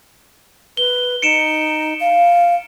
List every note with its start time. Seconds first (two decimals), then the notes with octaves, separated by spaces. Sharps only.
0.77 B4 G7
1.22 D#4 C#7 D7 E7
2.00 F5